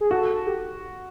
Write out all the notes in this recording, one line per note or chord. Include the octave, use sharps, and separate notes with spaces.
G#4
F#4 A4
G4